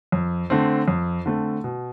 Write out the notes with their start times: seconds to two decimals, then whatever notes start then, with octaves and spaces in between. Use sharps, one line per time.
0.12 F2
0.50 D3 A3 C4
0.88 F2
1.26 D3 A3 C4
1.64 B2